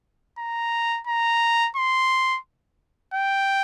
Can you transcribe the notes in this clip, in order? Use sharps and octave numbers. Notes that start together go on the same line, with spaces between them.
A#5
A#5
C6
G5